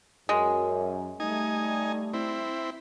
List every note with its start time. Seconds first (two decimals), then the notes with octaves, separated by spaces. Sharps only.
0.29 F#2 G#3
1.20 G3 A3 D#4 G#5
2.13 C4 E4